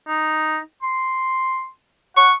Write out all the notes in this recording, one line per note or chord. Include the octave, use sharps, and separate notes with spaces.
D#4
C6
F#5 C#6